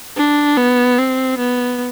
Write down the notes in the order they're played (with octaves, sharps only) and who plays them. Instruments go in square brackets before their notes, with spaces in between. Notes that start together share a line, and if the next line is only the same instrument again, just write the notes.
[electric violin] D4
B3
C4
B3